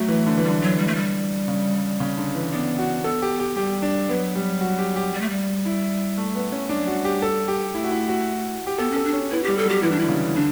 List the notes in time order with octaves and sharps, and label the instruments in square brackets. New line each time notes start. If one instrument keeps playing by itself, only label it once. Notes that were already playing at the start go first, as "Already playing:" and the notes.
Already playing: [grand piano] F#3 [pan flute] A3
[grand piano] E3
D3
E3
[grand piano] D3 [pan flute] G3
[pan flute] F#3
G3
A3
G3
[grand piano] C#3
C#3
D3
E3
[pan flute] B3 [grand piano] D4
[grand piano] F#4
[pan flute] B3 [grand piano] A4
[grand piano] G4
G4
[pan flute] G3 [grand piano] G4
[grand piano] D4
[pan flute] F#3 [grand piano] B3
[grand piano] G3
F#4
G4
G4
[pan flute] G3
A3
G3
[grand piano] E4
A3
B3
C#4
[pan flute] G3 [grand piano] D4
[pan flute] F#3
[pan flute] G3 [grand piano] F#4
[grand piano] G4
A4
G4
[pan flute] A3 [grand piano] E4
[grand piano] F#4
E4
F#4
G4
[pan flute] B3 [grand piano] A4
[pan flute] C#4 [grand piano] A4
[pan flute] D4
[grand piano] C#4
[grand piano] B3 [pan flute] E4
[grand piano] G3 [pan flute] G4
[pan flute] A4
[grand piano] F#3 [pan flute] G4
[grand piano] E3 [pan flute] E4
[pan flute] D4
[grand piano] D3 [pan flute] E4
[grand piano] C#3
[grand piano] D3 [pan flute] D4